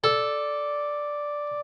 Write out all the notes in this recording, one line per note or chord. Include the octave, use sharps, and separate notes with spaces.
A4 D5